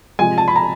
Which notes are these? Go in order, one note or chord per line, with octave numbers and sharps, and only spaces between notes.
C3 F3 G#3 G#5
A5
B5
A#5